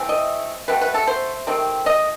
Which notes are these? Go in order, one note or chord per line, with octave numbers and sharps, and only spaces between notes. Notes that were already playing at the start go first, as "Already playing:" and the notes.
Already playing: E3 A3 C4
D#5
B2 A3 C4 B4
B4
A4
C5
C3 D#3 A3 C4
D#5